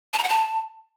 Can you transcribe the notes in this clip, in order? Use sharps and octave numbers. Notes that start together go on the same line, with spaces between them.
A5
A#5
F#5
A5